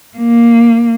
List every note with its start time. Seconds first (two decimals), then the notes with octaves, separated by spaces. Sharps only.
0.17 A#3